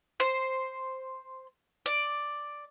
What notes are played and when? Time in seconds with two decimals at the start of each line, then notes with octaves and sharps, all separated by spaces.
0.20 C5
1.86 D5